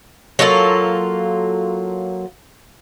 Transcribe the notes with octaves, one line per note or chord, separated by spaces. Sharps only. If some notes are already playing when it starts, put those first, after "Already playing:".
F#3 A#3 F4 A4